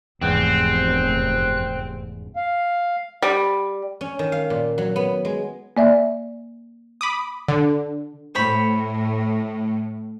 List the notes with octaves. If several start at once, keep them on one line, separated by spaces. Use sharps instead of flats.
F1 E2 G#2 B3 C4 F#6
F5
G3
C#4
D#3
F5
A#2
F#3
B3
G#3
A#3 D5 E5
B5 D6 D#6
D3
A2 C5 C#5 B5